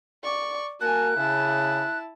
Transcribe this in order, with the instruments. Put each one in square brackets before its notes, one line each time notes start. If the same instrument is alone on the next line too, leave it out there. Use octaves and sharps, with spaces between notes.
[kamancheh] D5 C#6
[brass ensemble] A#3 F#4 A#4 [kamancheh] G#5 A5 [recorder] F#6
[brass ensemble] C#3 [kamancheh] E4 A5